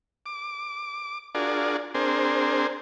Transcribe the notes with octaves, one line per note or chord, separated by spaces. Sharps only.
D6
D4 F4 F#4 G#4 A#4 D5
C4 D4 G#4 A#4 C5